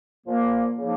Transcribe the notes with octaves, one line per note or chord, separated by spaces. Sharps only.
A#2 F3 A#3
C#3 F3 A#3 D#4